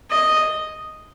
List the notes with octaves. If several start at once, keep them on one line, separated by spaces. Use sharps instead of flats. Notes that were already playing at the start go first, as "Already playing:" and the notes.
D#5